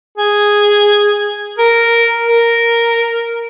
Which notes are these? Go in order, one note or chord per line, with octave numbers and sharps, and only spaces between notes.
G#4
A#4
A#4